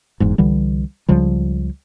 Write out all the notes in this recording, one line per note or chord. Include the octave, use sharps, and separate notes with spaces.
F#1 E2 G#2
C2 D3 E3 G3
C#2 C#3 F3 G3